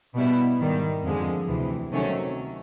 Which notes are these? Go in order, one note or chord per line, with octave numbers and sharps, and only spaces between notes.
B2 G3 B3 E4
G#2 D#3 G3
F2 D3 F3 G#3
D2 C3 E3
C3 D#3 F#3 A3 C#4